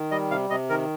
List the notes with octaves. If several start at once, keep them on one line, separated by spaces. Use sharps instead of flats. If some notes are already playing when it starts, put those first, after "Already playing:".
Already playing: D#3
G3 D#5
C3 F5
C3 D#5
D#3 A#4